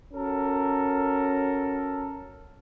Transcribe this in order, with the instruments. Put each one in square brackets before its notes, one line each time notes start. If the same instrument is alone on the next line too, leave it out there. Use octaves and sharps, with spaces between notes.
[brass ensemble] C#4 F#4 A4 A#4